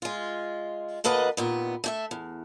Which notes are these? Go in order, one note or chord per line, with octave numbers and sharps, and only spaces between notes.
G#3 F4
D2 A#3 A4 B4 D#5 F#5
D#2 A#2 B3
A3 G4 E5
E2